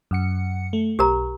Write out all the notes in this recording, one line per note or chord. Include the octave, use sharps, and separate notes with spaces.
F#2 F#5 C#7
A3
B1 G4 A#4 A#5